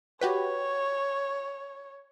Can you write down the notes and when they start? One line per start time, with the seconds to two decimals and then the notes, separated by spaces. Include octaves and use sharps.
0.21 F#4 G4 B4 C#5